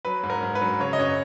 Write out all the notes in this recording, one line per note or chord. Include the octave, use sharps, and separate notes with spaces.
F#3 B4
G#2
A#4
G#2
B4
F#3
C#3 C#5
D#5
F#2 C#5